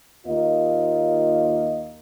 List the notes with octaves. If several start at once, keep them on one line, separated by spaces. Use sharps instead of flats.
D#2 A#3 F4 D#5